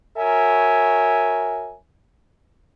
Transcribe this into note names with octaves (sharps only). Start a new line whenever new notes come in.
F#4 A#4 C#5 E5 G#5